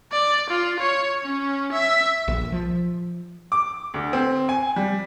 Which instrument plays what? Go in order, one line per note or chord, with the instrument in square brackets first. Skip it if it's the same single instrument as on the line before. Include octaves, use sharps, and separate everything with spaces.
[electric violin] D5
F4
C#5
C#4
E5
[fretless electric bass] A#1
F3
[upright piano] D6
D2
C4
G#5
G3